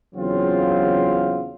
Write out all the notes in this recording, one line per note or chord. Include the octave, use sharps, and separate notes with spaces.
E2 C#3 F#3 C4 F4